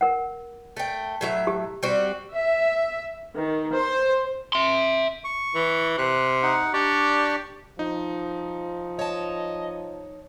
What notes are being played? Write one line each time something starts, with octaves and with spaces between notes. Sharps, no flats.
A#4 F#5
A3 G5
A2 F#3 E5
G4
G3 C4 F#4
E5
D#3
C5
E5 C6
C#6
E3
C3 F#6
D#4 F#5
D4 G4 D5 C#6
F3 D#4
C#5 D#5 A5